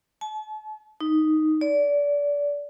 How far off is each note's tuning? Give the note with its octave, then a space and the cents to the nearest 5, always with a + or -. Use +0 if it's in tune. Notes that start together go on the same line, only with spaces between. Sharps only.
A5 -40
D#4 +0
D5 -25